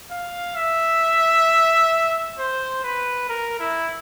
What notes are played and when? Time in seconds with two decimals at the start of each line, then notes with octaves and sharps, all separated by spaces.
0.11 F5
0.56 E5
2.38 C5
2.84 B4
3.29 A#4
3.60 E4